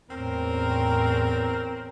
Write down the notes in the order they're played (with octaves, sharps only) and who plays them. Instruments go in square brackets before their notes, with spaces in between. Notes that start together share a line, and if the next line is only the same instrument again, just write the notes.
[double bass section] E2 A2 C#4 [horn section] C4 A#4